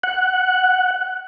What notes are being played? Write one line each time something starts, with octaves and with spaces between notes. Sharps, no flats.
F#5